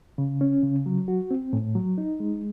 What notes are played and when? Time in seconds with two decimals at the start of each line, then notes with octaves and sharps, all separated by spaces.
0.18 C#3
0.41 C#4
0.63 C#3
0.86 F#3
1.08 F#4
1.31 C4
1.53 A2
1.75 F#3
1.98 D#4
2.20 G#3